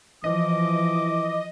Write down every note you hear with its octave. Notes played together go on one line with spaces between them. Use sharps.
E3 F3 D#5 D6